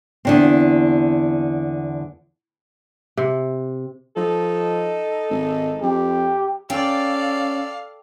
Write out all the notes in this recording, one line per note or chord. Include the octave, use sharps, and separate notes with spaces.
E2 D3 C4
C3
F3 D#4 A4
G#1
F2 G4
C#4 A4 D5 F5 G5